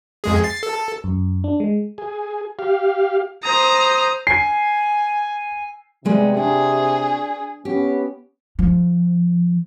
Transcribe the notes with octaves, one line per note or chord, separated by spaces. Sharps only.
F2 G#3 G#4
A6 C7
A4
F#2
D4
G#3
G#4
G4 F5
C5 A#5 D#6
G#5 C7
C3 G3 G#3 B3
D4 G#4
B3 C#4 G4
F3